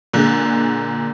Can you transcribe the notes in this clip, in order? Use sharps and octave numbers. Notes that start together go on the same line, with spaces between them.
A#2 D3 G#3